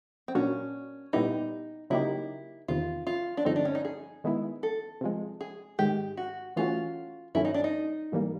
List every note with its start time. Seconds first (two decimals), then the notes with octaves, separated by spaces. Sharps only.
0.28 C4
0.35 A#2 F#3 A#3 C#4 D4 F#4
1.13 A#2 G3 B3 D#4 E4 G4
1.90 C#3 F#3 A#3 D#4 E4 G4
2.68 E2 C3 D#3 F4
3.07 F4
3.37 D4
3.45 G2 D3 F3 A3 C4 D#4
3.56 D4
3.65 C#4
3.75 D#4
3.85 G#4
4.24 D#3 G#3 B3 E4
4.63 A4
5.01 C3 F3 G#3
5.41 G#4
5.79 G#2 D#3 G#3 G4
6.17 F#4
6.56 E3 A3 C#4 F4 F#4
7.35 G2 D#3 F#3 A3 C#4 E4
7.45 D#4
7.54 D4
7.64 D#4
8.12 G#2 E3 G3 A#3